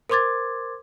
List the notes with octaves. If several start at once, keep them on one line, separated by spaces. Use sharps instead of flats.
A#4 C5 C6 D6 G#6 A6